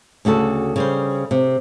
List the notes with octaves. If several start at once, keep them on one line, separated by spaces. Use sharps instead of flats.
D2 C#3 F#4 A4
C#3 G3 C5
C3